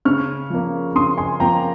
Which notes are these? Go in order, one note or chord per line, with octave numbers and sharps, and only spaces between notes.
C#3 C#6 F6
F3 A#3
C#3 C6 D#6
G#5 C6
F3 A#3 G5 A#5